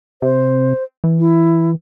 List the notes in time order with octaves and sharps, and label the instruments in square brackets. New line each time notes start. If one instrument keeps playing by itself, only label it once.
[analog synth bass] C3 [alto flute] C5
[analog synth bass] E3
[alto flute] E4